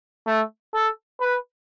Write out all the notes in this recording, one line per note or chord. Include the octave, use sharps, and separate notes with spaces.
A3
A4
B4